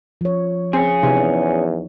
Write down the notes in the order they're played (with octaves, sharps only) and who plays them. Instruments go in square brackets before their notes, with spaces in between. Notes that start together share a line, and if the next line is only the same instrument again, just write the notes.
[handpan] F3 C#5
[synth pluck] C4 [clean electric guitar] C#4 G#4
[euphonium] E2 [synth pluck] C3 [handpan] D#4